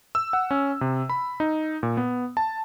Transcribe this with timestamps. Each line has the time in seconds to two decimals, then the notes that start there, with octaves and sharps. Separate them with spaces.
0.15 E6
0.33 F#5
0.51 C#4
0.81 C3
1.09 B5
1.40 D#4
1.83 A#2
1.97 B3
2.37 A5